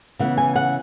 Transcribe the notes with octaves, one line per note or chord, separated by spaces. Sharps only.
C#3 E3 B3 F#5
G#5
F#5